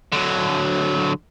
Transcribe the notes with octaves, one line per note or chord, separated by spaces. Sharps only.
D3 F#3